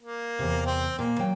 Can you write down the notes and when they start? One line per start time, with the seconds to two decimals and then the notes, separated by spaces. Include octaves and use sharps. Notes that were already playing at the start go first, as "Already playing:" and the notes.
0.01 A#3
0.39 E2 C3
0.66 C4
0.99 A#2 A#3
1.19 F#3 G5